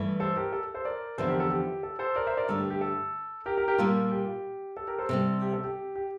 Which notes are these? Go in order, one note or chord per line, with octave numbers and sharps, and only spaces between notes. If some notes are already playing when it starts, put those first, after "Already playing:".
Already playing: G2 E3 A3
A4 C5
G4 A#4
A4
A4 C5
A#4 D5
E2 D3 F3 C4 E4 A4 C5
G4 A#4
A4
G4
A4
A4 C5
A#4 D5
C5 E5
A#4 D5
G2 D3 A3 A4
G4
G4
A4
G4 A#4
G4 A#4
G4 A#4
A#2 G3 A#3 F4 A4
G4
A4
G4 A#4
A4 C5
C3 G3 C4 A4
G4
A4
G4
G4